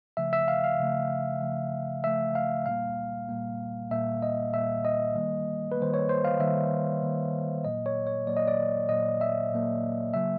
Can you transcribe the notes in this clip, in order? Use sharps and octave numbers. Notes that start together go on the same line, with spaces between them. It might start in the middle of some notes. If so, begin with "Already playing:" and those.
C#3 F3 A3 E5
E5
F5
F5
C#3 F3 A3
C#3 F3 A3
C#3 F3 A3 E5
F5
A#2 G3 A#3 F5
A#2 G3 A#3
A#2 G3 A#3 E5
D#5
A#2 G3 A#3 E5
D#5
D#3 G3 A#3
B4
D#3 G3 A#3 C5
C#5
C5
F5
D#3 G3 A#3 E5
D#3 G3 A#3
A#2 F#3 A#3 D#5
C#5
C#5
A#2 F#3 A#3 D5
D#5
D5
A#2 F#3 A#3 D#5
E5
A#2 F#3 A#3
C#3 F#3 A#3 E5